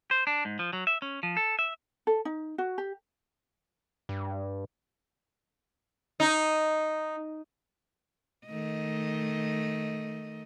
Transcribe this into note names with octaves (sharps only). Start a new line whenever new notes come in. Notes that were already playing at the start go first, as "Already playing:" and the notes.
C5
D4
G#2
F3
F#3
E5
C#4
F3
A4
E5
A4
D#4
F#4
G4
G2
D#4
D#3 A3 D#5